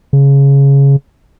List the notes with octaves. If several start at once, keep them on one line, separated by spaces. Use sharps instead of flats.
C#3